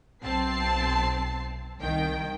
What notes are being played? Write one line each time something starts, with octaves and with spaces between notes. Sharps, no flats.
B1 C4 A5 C7
C2 D#3 G5